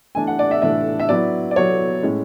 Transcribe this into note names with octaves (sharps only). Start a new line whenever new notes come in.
E3 A3 D4 G#5
F#5
D5
E5
E3 A3 D4 E5
E5
F#3 B3 E4 D5
D5
F#3 B3 E4 C#5
A2 G#3 C#4